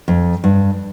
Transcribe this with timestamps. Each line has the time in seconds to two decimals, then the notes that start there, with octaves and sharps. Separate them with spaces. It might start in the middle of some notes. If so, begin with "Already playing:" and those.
0.08 F2
0.44 G2